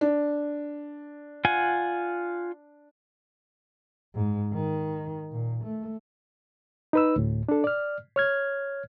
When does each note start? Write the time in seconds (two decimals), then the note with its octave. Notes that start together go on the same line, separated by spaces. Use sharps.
0.01 D4
1.45 F4 F#5 G#5
4.14 G#2
4.54 D#3
5.32 A#2
5.64 A3
6.93 D#4 B4 E6
7.16 D2 A2
7.49 D4 A4
7.64 D5 F6
8.16 C#5 F6 G#6